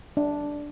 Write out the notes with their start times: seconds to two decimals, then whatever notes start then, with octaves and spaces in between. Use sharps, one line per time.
0.17 D4